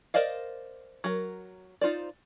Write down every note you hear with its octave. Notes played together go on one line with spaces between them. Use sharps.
A#4 C5 D5 D#5 F5
F#3 A#4
D#4 F4 C5 D5